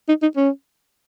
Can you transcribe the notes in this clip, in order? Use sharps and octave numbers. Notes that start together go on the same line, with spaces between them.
D#4
D#4
C#4